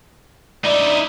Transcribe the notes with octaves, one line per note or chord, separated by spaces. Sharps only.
D#4 E4 D5